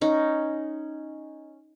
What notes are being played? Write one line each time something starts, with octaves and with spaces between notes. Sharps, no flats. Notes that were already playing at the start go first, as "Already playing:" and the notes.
C#4 D#4